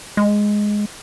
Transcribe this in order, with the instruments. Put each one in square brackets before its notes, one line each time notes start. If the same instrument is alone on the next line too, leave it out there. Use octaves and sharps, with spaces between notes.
[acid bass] G#3